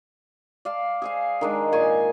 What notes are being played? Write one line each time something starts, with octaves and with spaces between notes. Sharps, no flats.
D5 F5 A5
G#4 C5 F5
D#3 G#3 D4
A#2 G#5 C#6